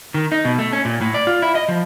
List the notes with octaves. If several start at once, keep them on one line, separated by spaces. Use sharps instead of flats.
D#3
D#4
B2
A3
C#4
A#2
A2
D5
F4
E4
D#5
F3